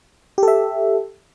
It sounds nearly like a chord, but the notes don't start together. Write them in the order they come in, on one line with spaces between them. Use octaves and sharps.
G4 A4 E5